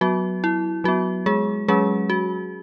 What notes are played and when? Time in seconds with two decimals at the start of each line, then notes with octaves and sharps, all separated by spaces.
0.01 F#3 B3 F#4
0.44 E4
0.84 F#3 B3 F#4
1.26 G#3 G#4
1.68 F#3 G#3 C#4 G#4
2.10 F#4